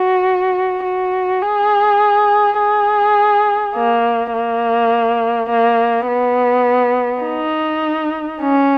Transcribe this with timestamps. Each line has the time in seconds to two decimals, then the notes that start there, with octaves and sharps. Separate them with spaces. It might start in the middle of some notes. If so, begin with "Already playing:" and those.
Already playing: F#4
0.84 F#4
1.42 G#4
2.59 G#4
3.75 A#3
4.33 A#3
5.50 A#3
6.08 B3
7.24 D#4
8.41 C#4